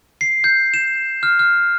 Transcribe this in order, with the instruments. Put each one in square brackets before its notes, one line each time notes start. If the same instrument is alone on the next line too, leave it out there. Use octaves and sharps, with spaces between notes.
[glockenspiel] C7
G6
E7
F6
F6